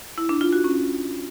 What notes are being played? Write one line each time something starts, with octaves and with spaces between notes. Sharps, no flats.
E4
D4
F4
F#4
C#4